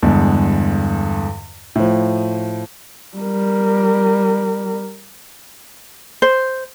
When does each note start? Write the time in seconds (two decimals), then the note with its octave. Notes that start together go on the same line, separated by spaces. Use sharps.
0.03 E2 G2 D3 G#3
1.76 A2 F3
3.17 G3 A#4
6.22 C5